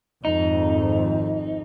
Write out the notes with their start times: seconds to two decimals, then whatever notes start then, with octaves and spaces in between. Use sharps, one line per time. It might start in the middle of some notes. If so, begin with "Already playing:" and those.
0.25 G#1 F2 D#4